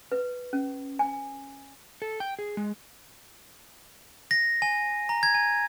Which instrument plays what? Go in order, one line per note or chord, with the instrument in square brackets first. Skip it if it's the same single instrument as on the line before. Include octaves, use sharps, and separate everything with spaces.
[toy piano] B4
C#4
G#5
[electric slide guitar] A4
G5
G#4
G#3
[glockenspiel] A#6
G#5
A#5
G#6
G#5